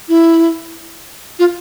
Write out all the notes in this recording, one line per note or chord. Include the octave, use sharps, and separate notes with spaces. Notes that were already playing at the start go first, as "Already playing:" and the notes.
E4
F4